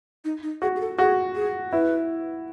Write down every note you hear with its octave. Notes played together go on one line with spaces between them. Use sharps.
D#4
D#4
F#4 G#4
G#4
A4
F#4 G#4
G#4
E4 B4